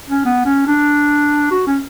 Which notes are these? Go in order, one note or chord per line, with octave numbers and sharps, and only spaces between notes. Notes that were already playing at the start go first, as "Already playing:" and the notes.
C#4
B3
C#4
D4
F#4
C#4